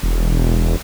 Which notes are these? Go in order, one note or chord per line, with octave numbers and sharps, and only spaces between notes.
E1